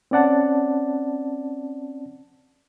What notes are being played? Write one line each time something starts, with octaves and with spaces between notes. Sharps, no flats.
C4 C#4 D5 F#5 A5